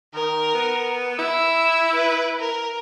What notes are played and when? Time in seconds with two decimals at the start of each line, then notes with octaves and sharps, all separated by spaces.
0.14 D#3 A#4
0.55 B3
1.19 E4 E6
1.94 B4
2.40 A#4